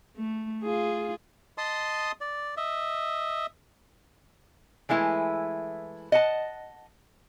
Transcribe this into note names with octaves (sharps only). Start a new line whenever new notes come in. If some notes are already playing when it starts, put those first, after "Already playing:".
A3
F4 G#4
D#5 A5 C6 D#6
D5
D#5 E5
E3 G#3 A3 E4 B4
D#5 F#5 A5